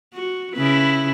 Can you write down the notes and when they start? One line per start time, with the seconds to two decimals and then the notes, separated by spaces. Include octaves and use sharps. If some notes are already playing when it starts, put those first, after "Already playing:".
0.13 F#4
0.55 C#3 E4 B4